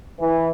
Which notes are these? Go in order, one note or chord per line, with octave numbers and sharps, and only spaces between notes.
E3